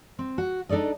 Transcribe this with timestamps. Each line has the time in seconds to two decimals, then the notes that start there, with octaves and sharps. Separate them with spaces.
0.19 C4
0.38 F#4
0.69 D4 D#4 A4 D5 D#5